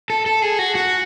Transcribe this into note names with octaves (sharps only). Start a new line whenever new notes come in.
A4
A4
G#4
F#4
F#4